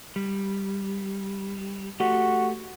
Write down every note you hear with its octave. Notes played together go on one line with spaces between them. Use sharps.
G3
A3 F#4 G4 A4